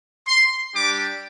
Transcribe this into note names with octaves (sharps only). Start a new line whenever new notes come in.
C6
G3 D4 G4 D6